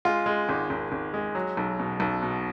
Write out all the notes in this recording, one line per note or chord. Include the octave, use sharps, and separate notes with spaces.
G#3 F4
G#3
G#1
G#1
G#1
G#3
F#3
B1
B2
B1
B2